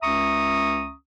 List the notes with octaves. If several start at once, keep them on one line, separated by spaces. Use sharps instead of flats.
C#2 C#4 E5 A#5 C#6 D#6